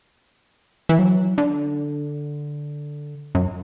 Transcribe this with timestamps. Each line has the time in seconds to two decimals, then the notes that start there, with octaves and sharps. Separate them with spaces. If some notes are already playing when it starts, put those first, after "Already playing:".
0.89 E3
0.99 F#3
1.38 D3
3.35 F#2